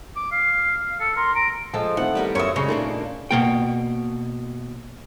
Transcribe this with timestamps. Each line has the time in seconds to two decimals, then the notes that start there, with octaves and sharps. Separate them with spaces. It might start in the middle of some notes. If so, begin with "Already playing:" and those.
0.16 D6
0.32 F5 C7
1.00 A4 C#7
1.16 A#4 C6
1.35 A#5 D7
1.74 F3 G#3 A4 A5
1.97 D#3 A3 C4 E4 F#5
2.15 G3 B3 A#4
2.35 F#2 F4 A#4 C#5 E5 D#6
2.56 C#3 G#3 C#4
2.68 A#2 A3 A#3 D4 D#4 D5
3.31 B2 A#3 G5